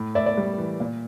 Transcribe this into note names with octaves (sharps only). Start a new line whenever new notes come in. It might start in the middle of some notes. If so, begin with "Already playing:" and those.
Already playing: A2
A2 D5 E5
D5 E5
G3
E3
A#2